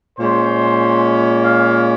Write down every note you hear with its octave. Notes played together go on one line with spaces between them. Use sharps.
A#2 G#3 C#4 C5
F5